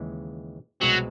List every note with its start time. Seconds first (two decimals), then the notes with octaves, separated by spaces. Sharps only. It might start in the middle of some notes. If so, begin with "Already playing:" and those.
Already playing: D#2 C#3 E3 G#3
0.80 C2 B2 F#3 G#3 C4